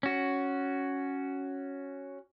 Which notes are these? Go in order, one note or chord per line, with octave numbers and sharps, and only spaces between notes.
C#4 F#4